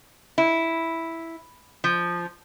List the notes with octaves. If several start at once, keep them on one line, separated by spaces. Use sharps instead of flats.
E4
F3